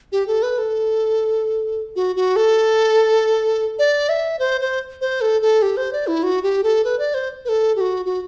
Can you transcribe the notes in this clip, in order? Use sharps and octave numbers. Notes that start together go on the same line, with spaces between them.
G4
A4
B4
A4
F#4
F#4
A4
D5
E5
C5
C5
C5
A4
A4
G4
C5
D5
E4
F#4
G4
A4
B4
D5
C5
B4
A4
G4
F#4
F#4